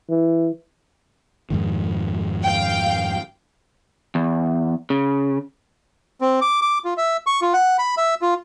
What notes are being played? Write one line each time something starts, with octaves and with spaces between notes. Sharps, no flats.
E3
F2 G#2 D#3
F5 G5
E2
C#3
C4
D6
D6
F4
E5
C#6
F4
F#5
B5
E5
F4